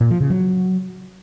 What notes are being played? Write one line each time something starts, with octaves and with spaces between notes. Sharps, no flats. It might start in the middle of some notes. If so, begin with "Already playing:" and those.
A#2
F3
C#3
F#3